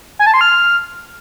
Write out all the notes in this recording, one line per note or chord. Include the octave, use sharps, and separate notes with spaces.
G#5
A5
C6
F6